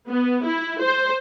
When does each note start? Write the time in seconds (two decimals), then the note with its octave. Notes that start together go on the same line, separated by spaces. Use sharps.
0.10 B3
0.45 E4
0.82 C5